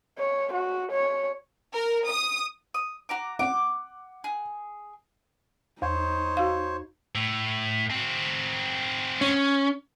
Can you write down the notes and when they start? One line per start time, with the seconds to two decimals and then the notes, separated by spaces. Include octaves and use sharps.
0.18 C#5
0.53 F#4
0.91 C#5
1.74 A#4
2.08 D#6
2.74 D#6
3.09 F#4 A#5 D6
3.39 F#5 D6
4.24 G#4
5.82 E2 D#4 C5 C#5
6.37 F#4 F5
7.15 A2
7.90 C4 F#4
9.21 C#4